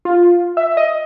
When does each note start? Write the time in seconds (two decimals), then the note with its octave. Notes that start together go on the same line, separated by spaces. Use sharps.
0.05 F4
0.57 E5
0.77 D#5